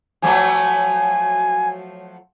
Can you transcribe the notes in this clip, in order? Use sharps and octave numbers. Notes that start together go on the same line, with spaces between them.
F3 F#3 A3 G#5